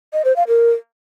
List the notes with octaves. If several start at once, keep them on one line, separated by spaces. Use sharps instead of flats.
D#5
C5
F5
A#4